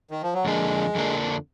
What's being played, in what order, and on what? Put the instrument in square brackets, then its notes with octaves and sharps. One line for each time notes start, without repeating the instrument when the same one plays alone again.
[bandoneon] D#3
F3
F#3
[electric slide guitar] F2 D3 F3 A#3 D4 [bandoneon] G#3
[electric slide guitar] F2 D3 F3 A#3 D4